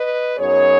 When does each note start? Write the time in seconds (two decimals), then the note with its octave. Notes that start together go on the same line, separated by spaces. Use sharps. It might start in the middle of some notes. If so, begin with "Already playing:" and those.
Already playing: B4 D#5
0.38 F#2 F#3 B3 D#4 G#4 C#5